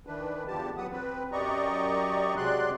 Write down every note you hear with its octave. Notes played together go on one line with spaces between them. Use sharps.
D#3 E3 D4 B4
E2 D3 F3 G4 A5
F#3 B4 F#5 D#6
C4 B4
F#2 G4 D5 D#5 A#5 C#6
C3 F#3 G#3 D5 C6 F#6